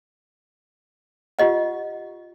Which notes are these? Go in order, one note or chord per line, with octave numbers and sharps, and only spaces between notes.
F4 G4 D#5 F#5